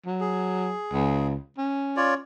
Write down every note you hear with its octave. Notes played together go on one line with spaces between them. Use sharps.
F#3
G#4
C#2
C#4
F4 C#5 D5